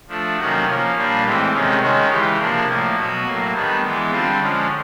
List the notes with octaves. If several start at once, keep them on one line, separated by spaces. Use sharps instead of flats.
F3 A3 D4
C3 D#3 F#3 A#3 C#4 F#4
F3 A#3 C#4
A#2 G3 A#3 D4
A2 E3 G#3 C4 G4
C3 D#3 G#3 C#4
D#3 G#3 C#4 F#4
C#3 E3 G#3 G4
C3 F3 A#3 D4
A2 F3 A#3
B2 F#3 B3 F#4
A2 F#3 A#3
D#3 G3 B3 D4
E3 G#3 B3
D3 G3 C4 F4
D3 F3 G#3 C#4